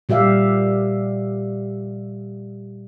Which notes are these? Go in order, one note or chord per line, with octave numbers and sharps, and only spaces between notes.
A#2 G3 G4 E5 F5